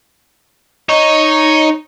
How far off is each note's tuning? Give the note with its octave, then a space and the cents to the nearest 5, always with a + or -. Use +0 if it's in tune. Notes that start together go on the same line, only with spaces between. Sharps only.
D#4 +0 C#5 +0